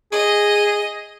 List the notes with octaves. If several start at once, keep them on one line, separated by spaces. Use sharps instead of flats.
G#4 D#5